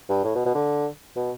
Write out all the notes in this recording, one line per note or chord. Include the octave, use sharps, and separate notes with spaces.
G2
A2
B2
B2
D3
B2